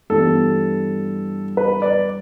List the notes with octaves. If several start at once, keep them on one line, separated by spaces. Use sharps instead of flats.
G2 E3 G3 B3 A4
B4
D5